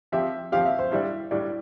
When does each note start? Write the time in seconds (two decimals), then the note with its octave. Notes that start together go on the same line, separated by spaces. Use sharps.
0.12 F3 C4 G4 E5
0.52 F3 C4 G4 F5
0.65 E5
0.79 C5
0.91 A2 G3 D4 E5
1.31 A2 G3 D4 D5